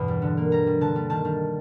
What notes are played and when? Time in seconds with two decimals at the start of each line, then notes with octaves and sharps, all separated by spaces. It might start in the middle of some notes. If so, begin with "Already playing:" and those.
Already playing: E2 G2 B2
0.08 G3
0.22 D3
0.37 A#3
0.52 G3 A#5
0.67 G3
0.81 D3 A5
0.95 G3
1.10 D#3 A5
1.25 D#3